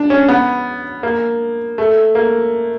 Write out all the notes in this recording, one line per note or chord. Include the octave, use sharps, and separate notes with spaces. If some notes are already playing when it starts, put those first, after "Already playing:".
Already playing: D4
C#4
B3
A#3
A3
A#3